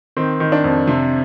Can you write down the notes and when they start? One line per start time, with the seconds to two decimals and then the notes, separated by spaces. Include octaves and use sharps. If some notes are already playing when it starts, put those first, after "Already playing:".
0.17 D#3 C4
0.40 D#3
0.52 D4
0.64 F2
0.88 C3